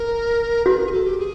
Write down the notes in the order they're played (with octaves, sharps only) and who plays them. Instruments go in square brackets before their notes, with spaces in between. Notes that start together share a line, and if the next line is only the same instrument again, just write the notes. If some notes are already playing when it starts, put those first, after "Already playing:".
Already playing: [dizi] A#4
[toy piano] F#4 [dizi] B4
[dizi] A#4
G#4
A4
G4
G#4